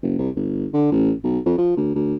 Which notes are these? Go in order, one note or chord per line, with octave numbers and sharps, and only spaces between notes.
F#1
C2
G1
D3
A1
B1
F2
F3
D2
D2